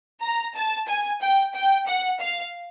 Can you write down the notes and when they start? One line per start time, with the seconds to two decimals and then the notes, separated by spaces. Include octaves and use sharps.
0.22 A#5
0.55 A5
0.88 G#5
1.22 G5
1.54 G5
1.86 F#5
2.20 F5